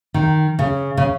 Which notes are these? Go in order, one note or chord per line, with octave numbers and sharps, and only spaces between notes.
D#3
C#3
C#3